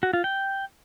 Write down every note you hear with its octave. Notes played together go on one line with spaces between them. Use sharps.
F#4
F4
G5